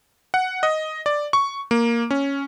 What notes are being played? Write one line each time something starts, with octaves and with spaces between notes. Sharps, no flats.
F#5
D#5
D5
C#6
A#3
C#4